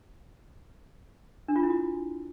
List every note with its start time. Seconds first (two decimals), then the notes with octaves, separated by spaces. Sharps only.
1.48 D4
1.56 F4
1.63 E4
1.70 F#4